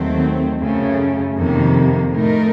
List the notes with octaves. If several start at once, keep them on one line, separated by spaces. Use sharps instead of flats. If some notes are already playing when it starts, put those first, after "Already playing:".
Already playing: D#2 D#3 F#3 A3 C4
F#2 C#3 A3
F2 C3 D#3 A#3
A2 A3 D#4 A#4